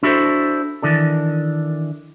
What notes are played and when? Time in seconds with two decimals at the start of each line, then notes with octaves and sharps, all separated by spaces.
0.03 D4 E4 F#4 G4 A4 C5
0.83 D#3 E3 D4 A4